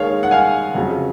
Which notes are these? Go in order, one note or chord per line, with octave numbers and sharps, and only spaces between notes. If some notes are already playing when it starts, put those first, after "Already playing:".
Already playing: D#2 D#3 G#3 C#5 F5
F#5
F5 G#5
F2 C#3 F#3